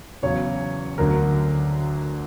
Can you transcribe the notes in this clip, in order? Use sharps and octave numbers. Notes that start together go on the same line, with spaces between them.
E2 C#3 F#3 C#5
D2 D3 F#3 A#4